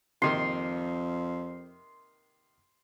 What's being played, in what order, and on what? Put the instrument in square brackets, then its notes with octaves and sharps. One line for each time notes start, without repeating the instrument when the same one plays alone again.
[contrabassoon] F2 [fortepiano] C3 D#3 A#3 [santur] C6